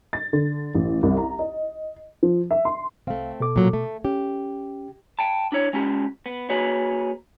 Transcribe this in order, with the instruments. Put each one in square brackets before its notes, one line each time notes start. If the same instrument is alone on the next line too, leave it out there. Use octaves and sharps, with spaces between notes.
[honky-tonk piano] A6
D3
A1
C2
A#5
D#5
F3
E5
C6
[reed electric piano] C2 F5 [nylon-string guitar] A3 C4
[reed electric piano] B2 A4 D6
[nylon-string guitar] A#2 F#3
A3
[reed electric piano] C#4 [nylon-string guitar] G4
[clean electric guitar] G5 A5
D4 E4 C#5
G#3 C#4 F4 G4
B3
A#3 F#4 G#4 B4 C#5